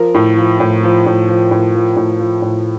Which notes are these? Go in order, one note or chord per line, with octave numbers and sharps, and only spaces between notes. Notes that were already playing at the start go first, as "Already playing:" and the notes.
Already playing: F3 A#4
A2
F3
A2
F3
A2
F3
A2
F3
A2
F3
A2